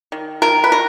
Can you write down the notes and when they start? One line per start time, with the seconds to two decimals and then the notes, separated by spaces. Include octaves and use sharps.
0.12 D#3
0.42 D#3 A#4
0.64 B4
0.72 D#3 A#4